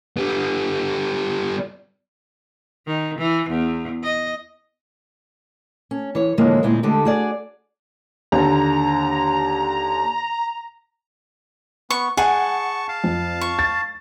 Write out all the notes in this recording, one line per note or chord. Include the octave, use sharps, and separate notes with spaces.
G3 B3
D#3
E3
E2
D#5
C#4
E3 C#5
A2 D3 E3 F3 G#3 A#3
D2 A#2 G#3 C4 E4
D3 G#3 A3 G4
F#4 G#4 D5
D#2 D3 A#5
B3 C#6
G#4 D#5 F#5 A5 C#6
F5 A5
F2
C#6
A6